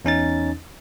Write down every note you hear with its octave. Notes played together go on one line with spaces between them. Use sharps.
E2 C#4 D#4 A6